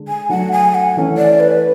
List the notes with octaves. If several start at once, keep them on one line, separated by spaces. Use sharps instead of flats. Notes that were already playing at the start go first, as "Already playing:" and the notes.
Already playing: D3 G#3 D4
G#5
F#3 A3 D4 F#5
G#5
F#5
E3 A3 C#4
D5
B4